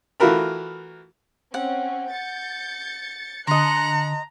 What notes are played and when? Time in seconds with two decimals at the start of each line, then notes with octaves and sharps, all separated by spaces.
0.20 E3 A3 F4 F#4 A#4 B5
1.54 C4 C#4 F#5
2.12 G6 A6 C#7
3.47 D3 D#5 A5 A#5 C6 F#6 C#7